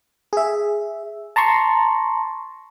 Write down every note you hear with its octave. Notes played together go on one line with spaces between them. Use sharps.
G#4 E5
A5 A#5 C6 C#6